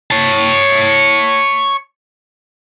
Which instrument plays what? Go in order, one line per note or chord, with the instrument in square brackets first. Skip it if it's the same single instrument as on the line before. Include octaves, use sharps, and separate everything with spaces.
[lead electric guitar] C#5 A5